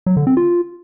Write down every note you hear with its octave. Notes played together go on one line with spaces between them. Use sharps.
F#3
D3
C4
F4